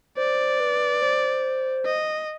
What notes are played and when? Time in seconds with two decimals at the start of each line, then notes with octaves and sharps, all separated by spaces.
0.17 C5 D5
0.60 B4
1.02 C5
1.86 D#5